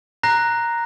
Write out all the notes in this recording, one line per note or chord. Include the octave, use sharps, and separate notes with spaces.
A#5 F#6 A#6 C7